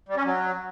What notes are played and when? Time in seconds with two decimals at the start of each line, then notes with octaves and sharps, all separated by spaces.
0.09 G3
0.17 C#4
0.25 F#3